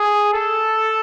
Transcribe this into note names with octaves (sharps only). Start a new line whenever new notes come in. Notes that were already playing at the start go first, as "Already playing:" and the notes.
Already playing: G#4
A4